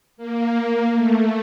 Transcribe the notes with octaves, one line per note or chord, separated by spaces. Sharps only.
A#3
A3